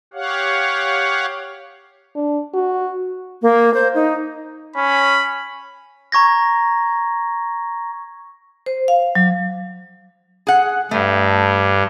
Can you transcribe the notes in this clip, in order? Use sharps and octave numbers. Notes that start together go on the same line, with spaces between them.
G4 C#5 F5 F#5
D4
F#4
A#3
C5
D#4
C#4 B5
A#5 C#6 G#6 A#6
C5
F5
F#3
G#4 F#5
G2 A3